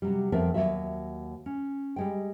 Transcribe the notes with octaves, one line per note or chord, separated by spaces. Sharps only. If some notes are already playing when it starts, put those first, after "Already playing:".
C3 F#3 G3
F2 F3 B3 C4 A#4 E5
D#2 D#3 F#3 F#4 E5
C#4
G3 G#3 G5